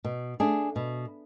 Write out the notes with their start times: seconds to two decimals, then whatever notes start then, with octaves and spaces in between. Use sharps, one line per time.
0.04 B2
0.40 A3 D4 G#4
0.76 B2